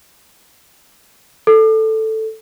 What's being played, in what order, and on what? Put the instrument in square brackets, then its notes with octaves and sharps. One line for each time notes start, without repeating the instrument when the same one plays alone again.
[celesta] A4